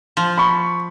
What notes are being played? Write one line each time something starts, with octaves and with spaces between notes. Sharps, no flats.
F3
B5 C#6